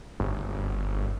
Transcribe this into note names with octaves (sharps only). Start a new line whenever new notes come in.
G1